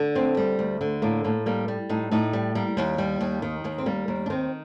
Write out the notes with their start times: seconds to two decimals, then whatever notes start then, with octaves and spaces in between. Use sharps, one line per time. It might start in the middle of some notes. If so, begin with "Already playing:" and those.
Already playing: D3
0.15 D2 C4
0.37 G3
0.59 D2
0.81 D3
1.02 A2 A#3
1.24 A2 A#3
1.46 G3 A#3
1.68 G3
1.89 A2 D#4
2.12 A2 D#4
2.33 G3
2.55 G3 A#3
2.77 D#2
2.98 G3
3.21 D#2
3.42 D#3
3.64 D#2 A#3
3.78 C4
3.86 G3 A#3
4.08 D#2 A#3
4.26 D4
4.30 D#3 C4